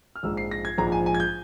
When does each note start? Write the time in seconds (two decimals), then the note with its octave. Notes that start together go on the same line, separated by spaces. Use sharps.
0.16 F6
0.23 A#1 G#2 F3 G#3 E6
0.37 C7
0.51 A#6
0.65 G#6
0.78 A#1 G#2 F3 G#3 A#5
0.92 G#5
1.06 G#5
1.15 G#6
1.20 G6